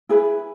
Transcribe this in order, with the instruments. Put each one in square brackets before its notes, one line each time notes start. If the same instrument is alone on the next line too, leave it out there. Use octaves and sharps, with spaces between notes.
[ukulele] E4 G#4 B4